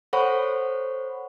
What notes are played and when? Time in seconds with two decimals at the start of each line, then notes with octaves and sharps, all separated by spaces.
0.13 A4 C5 C#5 F#5 B5 C#6